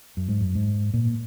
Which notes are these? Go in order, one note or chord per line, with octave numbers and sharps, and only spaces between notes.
F#2
G#2
F#2
G#2
A#2